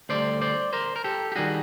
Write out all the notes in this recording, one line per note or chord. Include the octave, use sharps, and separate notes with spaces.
D2 D3 G3 C5 D5
C5 D5
A#4 C5
A#4
G4 A4
G4
D#3 G3 F#4 G#4